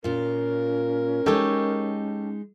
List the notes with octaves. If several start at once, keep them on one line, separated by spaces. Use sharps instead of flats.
A#2 C#4 F4 A#4
G#3 D#4 G4 A4 C#5